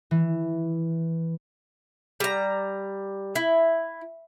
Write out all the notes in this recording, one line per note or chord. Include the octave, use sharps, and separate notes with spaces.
E3
G3 A#5
E4